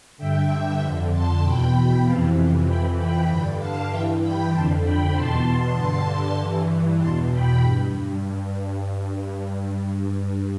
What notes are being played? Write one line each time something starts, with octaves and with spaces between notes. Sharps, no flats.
G2 D3 E5 G5
F2 D3
A5 C6
E2 B2 G5 B5
F2 C3 E3 F5 A5
F2 E3 G5 B5
G5 B5
G2 D3 G5 B5
F5 A5
G2 E3 E5 G5
G5 B5
F2 D3 A5 C6
G5 B5
E2 B2 A5 C6
G2 D3 A5 C6
G2 E3
E2 B2 A5 C6
G5 B5
G2